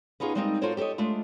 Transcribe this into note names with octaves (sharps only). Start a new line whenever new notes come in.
B3 C#4 D#4 F4 G#4
G3 G#3 A#3 C4 D4 D#4
F4 F#4 A4 A#4 C5 C#5
G4 A4 C5 C#5 D#5
G#3 A3 D4 F4